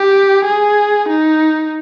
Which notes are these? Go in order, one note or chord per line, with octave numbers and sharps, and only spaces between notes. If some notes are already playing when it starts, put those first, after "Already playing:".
Already playing: G4
G#4
D#4